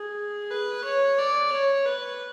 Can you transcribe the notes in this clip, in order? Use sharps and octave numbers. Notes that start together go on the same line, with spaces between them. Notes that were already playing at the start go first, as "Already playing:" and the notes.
Already playing: G#4
B4
C#5
D5
C#5
B4